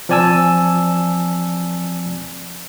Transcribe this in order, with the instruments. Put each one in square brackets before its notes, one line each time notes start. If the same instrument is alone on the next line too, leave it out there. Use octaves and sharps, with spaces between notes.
[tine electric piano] F3 C4 D5 G#5 A5 E6